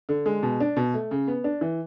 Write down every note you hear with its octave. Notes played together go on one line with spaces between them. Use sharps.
D3
G#3
B2
D4
B2
A3
C#3
B3
D4
E3